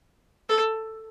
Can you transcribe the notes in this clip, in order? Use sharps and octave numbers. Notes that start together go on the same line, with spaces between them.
A4